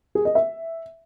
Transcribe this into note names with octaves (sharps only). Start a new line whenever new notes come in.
G#4
D#5
E5